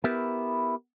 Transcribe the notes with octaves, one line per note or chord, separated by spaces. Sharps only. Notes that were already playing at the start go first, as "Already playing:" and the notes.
B3 E4 G4 A#4 B4